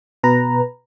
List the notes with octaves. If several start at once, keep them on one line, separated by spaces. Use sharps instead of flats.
B2 B4 A#5